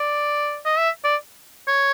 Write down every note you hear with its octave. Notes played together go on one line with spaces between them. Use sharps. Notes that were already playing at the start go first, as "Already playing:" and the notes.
Already playing: D5
D#5
E5
D5
C#5